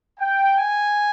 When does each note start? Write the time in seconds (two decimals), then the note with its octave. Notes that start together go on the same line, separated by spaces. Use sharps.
0.19 G5
0.56 G#5